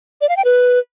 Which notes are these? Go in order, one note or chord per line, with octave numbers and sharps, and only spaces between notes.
D5
F5
G5
B4